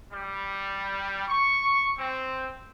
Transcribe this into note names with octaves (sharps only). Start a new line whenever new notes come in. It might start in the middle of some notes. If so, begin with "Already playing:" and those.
G3
C#6
C4